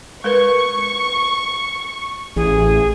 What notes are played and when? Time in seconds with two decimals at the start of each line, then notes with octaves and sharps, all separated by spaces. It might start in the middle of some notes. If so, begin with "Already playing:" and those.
0.24 G#3 A#4 B4 C#6
2.36 A1 G#4